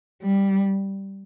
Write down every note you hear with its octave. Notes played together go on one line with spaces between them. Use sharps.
G3